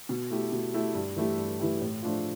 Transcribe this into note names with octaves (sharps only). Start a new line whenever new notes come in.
B2
A3 E4 G4
B2
A3 E4 G4
G2
E3 A3 E4 G4
G2
E3 A3 E4 G4
A2
F3 A3 D4 F4